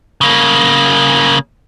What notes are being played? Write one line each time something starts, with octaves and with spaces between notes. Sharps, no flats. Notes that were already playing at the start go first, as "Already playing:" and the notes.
C#3 A#3